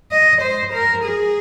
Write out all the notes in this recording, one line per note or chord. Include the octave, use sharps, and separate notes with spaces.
D#5
C5
A#4
G#4